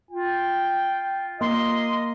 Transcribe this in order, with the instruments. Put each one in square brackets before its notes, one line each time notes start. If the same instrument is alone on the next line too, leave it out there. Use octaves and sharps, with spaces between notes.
[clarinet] F4 [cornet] G5
[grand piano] A#3 [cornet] D#5 [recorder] C6